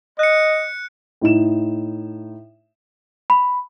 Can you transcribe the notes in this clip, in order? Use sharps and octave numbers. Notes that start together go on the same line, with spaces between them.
D#5 F#6 C#7
A2 D#4 E7
B5